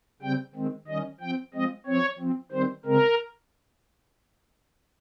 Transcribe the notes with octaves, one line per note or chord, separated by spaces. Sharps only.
C#3 G3 C4 G5
D#3 G#3 C4
D#3 G3 C#4 D#5
F3 C4 G5
F3 G#3 C4 D#5
F3 C4 C#5
F3 C4
D#3 G3 C4 C5
C#3 G#3 C4 A#4